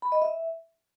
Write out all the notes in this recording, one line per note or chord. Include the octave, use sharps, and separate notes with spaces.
B5
D#5
E5